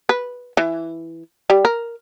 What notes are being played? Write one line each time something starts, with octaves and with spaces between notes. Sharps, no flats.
B4
E3
G3
A#4